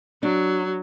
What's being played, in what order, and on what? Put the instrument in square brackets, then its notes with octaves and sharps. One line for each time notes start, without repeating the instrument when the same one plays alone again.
[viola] F#3 [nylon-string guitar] D4